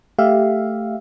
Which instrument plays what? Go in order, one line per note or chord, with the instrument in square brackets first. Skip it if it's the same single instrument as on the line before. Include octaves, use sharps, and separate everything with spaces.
[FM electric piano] A3 G4 E5 F5